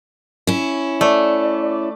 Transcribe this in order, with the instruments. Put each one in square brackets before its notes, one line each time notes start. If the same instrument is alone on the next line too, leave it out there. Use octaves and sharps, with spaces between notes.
[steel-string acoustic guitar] C#4 E4
[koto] A3 [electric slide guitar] D5